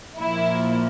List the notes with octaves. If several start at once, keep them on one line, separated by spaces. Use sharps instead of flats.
A#2 F3 A#3 E4